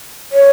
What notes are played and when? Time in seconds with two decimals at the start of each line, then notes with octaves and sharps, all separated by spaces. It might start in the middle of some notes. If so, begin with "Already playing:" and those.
0.32 C#5